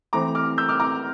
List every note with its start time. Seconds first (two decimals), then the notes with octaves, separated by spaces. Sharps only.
0.13 E3 A3 C4 A#5 D6
0.35 D6 F6
0.58 E6 G6
0.69 D6 F6
0.80 A#5 D6